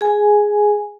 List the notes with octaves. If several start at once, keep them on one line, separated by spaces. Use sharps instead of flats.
G#4 G#5